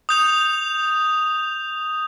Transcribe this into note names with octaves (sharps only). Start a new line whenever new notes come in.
D#6 G6 F7